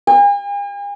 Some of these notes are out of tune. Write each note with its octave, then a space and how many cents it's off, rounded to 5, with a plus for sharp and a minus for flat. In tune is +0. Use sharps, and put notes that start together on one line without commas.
G#5 -45